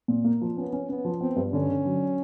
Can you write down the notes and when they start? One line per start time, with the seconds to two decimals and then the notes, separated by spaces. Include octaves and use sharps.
0.08 A#2
0.24 A#3
0.41 F3
0.57 B3 C#4
0.73 C#4
0.89 B3 C#4
1.05 F3
1.20 B3 C4
1.36 G2
1.53 D3 C#4
1.69 D3
1.85 F#3